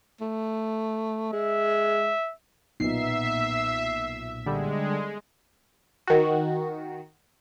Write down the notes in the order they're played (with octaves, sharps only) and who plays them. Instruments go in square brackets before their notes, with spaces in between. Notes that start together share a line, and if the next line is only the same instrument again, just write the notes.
[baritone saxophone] A3
[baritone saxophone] G#3 [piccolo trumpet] E5
[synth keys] B1 A#2 [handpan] B3 D#4 [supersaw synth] E5 [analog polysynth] C7
[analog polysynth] D3 G3 [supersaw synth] G#3
[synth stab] D#3 F#4